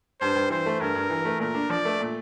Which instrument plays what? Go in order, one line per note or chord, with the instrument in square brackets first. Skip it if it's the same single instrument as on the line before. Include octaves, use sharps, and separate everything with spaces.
[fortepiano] G2 [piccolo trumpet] C5
[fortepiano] G2
[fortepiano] E3 [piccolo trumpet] C5
[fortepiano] A3
[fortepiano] G2 [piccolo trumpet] A#4
[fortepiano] G2
E3
A3
[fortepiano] A#2 [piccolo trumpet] A#4
[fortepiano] D4
[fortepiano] F3 [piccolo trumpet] D5
[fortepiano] A3
A#2